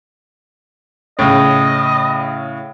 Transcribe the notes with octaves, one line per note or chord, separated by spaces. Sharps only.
A2 C#3 D#5